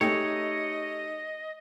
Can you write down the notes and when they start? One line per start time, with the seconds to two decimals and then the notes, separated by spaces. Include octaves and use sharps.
0.01 A3 D#4 G4 G#4 C#5 D#5